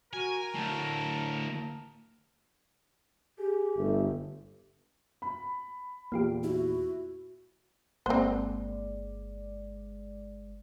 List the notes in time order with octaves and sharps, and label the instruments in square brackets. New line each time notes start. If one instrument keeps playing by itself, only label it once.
[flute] F#4 [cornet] A#4 [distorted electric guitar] G#5
[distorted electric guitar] D2 A2 [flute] A5
[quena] G4 [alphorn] G#4
[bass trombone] G1 [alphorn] A3
[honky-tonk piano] B5
[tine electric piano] E2 A#2 [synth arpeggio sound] A#3 F4 G4
[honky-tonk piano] E4 [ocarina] F#4
[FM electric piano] G1 G#3 D5 [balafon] A#3 [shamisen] C4 C5